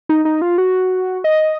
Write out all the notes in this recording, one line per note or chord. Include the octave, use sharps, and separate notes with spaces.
D#4
D#4
F4
F#4
D#5